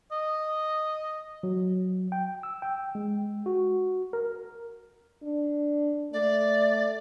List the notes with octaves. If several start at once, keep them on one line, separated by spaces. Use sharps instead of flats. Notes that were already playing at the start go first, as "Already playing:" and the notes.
D#5
F#3
G5
E6
G5
G#3
F#4
A#4
D4
A3 D5